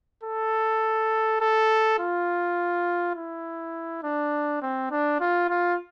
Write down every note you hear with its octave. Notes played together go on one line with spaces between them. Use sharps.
A4
A4
F4
E4
D4
C4
D4
F4
F4